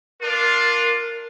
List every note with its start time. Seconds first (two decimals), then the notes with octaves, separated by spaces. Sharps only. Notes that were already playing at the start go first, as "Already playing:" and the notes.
0.22 D4 F4 A#4